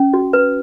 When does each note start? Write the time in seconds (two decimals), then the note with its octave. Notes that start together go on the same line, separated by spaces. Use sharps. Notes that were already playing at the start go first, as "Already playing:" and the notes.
Already playing: C#4
0.14 F#4
0.33 B4